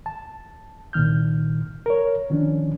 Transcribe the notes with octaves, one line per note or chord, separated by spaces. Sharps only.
A5
C2 A#2 D#3 F6 G6
A#4 C#5
D3 D#3 F3 C#4 D4